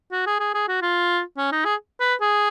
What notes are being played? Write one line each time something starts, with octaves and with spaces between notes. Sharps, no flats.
F#4
G#4
G#4
G#4
F#4
F4
C#4
D#4
G#4
B4
G#4